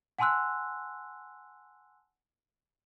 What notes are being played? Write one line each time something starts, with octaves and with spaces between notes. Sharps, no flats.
F#5 G#5 A5 C6 E6 F#6